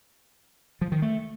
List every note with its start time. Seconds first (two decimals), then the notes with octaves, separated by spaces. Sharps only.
0.81 F3
0.92 D#3
1.02 A3